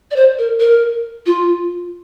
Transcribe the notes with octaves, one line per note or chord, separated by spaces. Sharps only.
D5
C5
A#4
A#4
F4